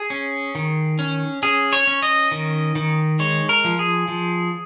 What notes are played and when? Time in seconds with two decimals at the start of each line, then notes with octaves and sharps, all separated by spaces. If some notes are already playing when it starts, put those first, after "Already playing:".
Already playing: G#4
0.10 C#4
0.55 D#3
0.99 C#4
1.43 C#4 G#4
1.73 C#5
1.87 C#4
2.02 D#5
2.31 D#3
2.75 D#3
3.19 G#3 C#5
3.49 A#4
3.64 F3
3.79 G#4
4.08 F3